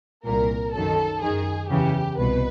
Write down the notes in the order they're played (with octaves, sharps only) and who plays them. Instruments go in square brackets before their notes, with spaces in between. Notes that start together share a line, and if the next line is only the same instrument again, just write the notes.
[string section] C2 A#2 A#4
F#2 D#3 A4
F#2 D#3 G#4
E2 C#3 E3 G4
C2 B2 B4